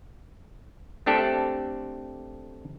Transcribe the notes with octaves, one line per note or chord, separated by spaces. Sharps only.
A3 C4 D4 G4 A4